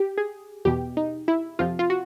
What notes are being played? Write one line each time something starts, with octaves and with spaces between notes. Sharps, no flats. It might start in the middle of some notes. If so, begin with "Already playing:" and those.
Already playing: G4
G#4
E2 B2 G4
D#4
E4
F2 C3 F3 F4
F4
F#4